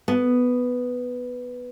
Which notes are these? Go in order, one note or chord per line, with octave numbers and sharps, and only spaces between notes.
B3